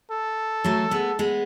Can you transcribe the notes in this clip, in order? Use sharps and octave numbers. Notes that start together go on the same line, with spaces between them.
A4
F#3 A3
G#3 B3
G#3 B3